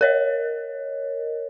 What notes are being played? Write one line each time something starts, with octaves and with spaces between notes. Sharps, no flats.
A#4 C#5 D#5